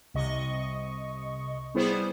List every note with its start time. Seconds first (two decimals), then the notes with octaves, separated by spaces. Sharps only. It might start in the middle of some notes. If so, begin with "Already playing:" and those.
0.14 C2 C3 D#5 C#6
1.74 G3 B3 E4 G#4 C5